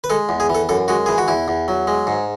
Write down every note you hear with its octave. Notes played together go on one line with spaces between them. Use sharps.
B4
G#3 A4
E2
G#4
E3
A4
F#2 A4
G#3 F#4
E3 G#4
F#4
E2 E4
E2
F#3
G#3
G#2